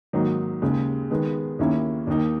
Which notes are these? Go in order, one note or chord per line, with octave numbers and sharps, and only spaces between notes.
G#2 D#3 F#3 A#3 D#4
D#2 C#3 G#3
D#3 G#3 B3
D#2 D#3 A#3 C#4 E4
D#2 D#3 A#3 D#4